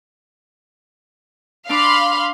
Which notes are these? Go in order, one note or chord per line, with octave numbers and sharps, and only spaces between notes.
D4 F5 B5 C6 D6